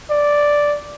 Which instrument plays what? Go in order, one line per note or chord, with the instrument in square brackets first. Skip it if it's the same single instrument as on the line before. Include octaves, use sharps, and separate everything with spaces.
[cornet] D5